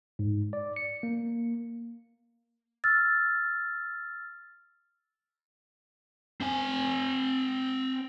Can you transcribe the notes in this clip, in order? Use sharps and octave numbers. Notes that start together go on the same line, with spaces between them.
G#2
D5
C#7
A#3
E6 F6 A6
C4 G#5